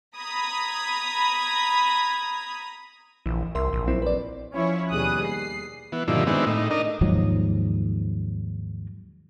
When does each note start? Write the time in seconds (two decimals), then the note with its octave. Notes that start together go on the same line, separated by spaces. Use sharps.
0.16 A#5 B5 D#6 G#6
3.26 A#1 E3 E4
3.55 C2 A#4 E5 C6
3.73 A#1
3.87 F#3 C4 E4
4.02 B4 D5
4.54 F3 C#4 E4 C#5
4.90 D#2 B2 G3 G#4 D#6 F#6
5.25 C7
5.92 E3 B3
6.08 G2 A#2 D3 D#3 F3 E4
6.27 D#3 G#3 B3 C4 D4 E4
6.47 A2 D#4
6.71 D4 D#4 A#4 D#5
7.01 D#2 G#2 F3 F#3